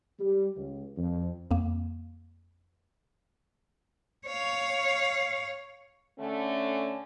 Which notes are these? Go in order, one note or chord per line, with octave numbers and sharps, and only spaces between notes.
G3
C#2
F2
F2 A#3
C#5 F5
D3 A3 C#4